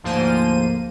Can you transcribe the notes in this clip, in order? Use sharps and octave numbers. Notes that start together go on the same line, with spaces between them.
D2 G#2 F3 A#3 C5 D#7